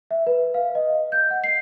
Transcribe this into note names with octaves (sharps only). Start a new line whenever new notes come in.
E5
B4
F5
D#5
G6
F#5
C7